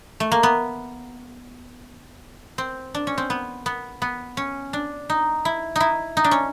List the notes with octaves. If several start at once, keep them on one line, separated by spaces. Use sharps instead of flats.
A3
A#3
B3
C4
D4
C#4
C4
B3
B3
B3
C#4
D4
D#4
E4
D#4 E4
D#4
D4
C#4